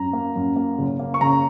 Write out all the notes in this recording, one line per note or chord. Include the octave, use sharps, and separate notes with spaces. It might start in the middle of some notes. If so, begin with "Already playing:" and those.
Already playing: F#2 A#5
A#3
F#2
A#3
F#1
A#3
C#6
C#3 A#5